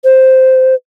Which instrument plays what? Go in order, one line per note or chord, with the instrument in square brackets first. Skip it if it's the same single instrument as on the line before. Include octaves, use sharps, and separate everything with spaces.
[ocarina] C5